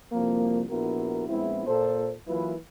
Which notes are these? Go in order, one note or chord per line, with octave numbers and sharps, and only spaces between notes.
C2 F2 F3 A#3
A#1 B3 E4 F#4 A#4
A#1 G#3 B3 C4 E4
A#2 A4 C5
E3 F#3 A#3 E4 F4 B4